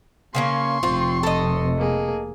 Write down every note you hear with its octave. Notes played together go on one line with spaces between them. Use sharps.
C#3 A#3 C#4 C6 C#6
F1 C3 C4 F4
A4 D#5
A#3 G#4